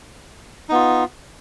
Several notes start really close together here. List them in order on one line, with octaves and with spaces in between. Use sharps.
D#4 B3 F4